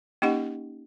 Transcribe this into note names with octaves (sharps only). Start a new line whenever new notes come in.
A#3 C#4 D#4 G4 D#5 F#5